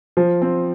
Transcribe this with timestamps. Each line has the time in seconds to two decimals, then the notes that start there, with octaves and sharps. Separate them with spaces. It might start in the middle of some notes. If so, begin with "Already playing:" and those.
0.17 F3
0.42 C4